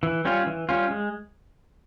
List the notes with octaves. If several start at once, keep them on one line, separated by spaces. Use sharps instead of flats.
E3
G3 C#4 F4
E3
G3 C#4 F4
G#3